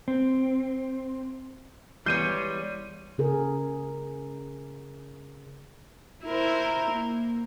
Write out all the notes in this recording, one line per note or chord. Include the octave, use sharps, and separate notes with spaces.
C4
E3 G3 G#3 B3 C#5 C6 G6 D#7
C#3 G#4 A#4
E4 A#4 C5
A#3